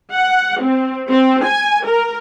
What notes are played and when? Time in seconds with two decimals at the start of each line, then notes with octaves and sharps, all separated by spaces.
0.14 F#5
0.60 C4
1.10 C4
1.44 G#5
1.86 A#4